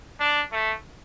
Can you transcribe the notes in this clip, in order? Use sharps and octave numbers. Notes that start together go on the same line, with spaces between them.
D4
A3